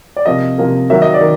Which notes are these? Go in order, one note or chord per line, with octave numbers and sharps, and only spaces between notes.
D5
C3 F3 A#3 D#5
C3 F3 A#3
D#3 F#3 A#3 E5
D#5
D5
D#3